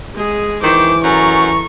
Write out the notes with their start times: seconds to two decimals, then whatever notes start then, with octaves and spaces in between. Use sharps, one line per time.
0.14 G#3 G#4
0.63 D#3 E3 C5 D6
1.04 F#2 A4 A#5 C#6